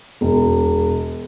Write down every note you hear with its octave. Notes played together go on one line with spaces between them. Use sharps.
E1